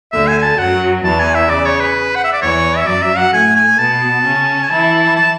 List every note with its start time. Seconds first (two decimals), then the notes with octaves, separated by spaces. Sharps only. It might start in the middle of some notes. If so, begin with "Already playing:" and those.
0.12 D2 D3 E5
0.27 G#5
0.38 G#5
0.42 A5
0.58 F#2 F#3 F#5
1.03 E2 E3 A5
1.19 G#5
1.35 E5
1.50 C#3 D5
1.65 C#5
1.80 B4
2.15 F#5
2.24 E5
2.33 D5
2.41 E2 E3 C#5
2.77 E5
2.86 F#2 F#3 D5
3.02 E5
3.17 F#5
3.33 A2 A3 G#5
3.56 G#5
3.78 B2 B3 A5
4.24 C#3 C#4
4.63 G#5
4.70 E3 E4 A5
5.16 A5